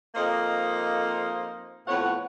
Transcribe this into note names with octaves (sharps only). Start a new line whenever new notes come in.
F2 A#3 D#4 C5 D#5 F5
F2 A2 B3 C#5 F#5